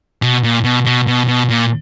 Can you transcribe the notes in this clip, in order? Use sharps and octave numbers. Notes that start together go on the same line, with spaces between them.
B2
A#2
B2
B2
B2
B2
A#2